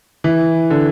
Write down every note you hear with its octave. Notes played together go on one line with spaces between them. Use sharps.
E3
D3